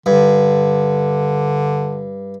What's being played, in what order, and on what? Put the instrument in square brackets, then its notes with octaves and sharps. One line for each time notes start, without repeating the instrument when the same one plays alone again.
[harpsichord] G2 [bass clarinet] D3